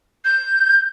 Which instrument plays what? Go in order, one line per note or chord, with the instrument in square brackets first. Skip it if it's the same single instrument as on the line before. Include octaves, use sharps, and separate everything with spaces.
[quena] G6